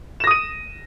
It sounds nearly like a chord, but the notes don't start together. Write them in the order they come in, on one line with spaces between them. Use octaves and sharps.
E7 A#6 D#6 D#7